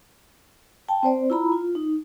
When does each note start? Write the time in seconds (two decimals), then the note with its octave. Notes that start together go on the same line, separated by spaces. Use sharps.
0.89 G5 A5
1.03 C4 C5 D5
1.30 E4 F4 A#5 B5
1.52 F4
1.75 D#4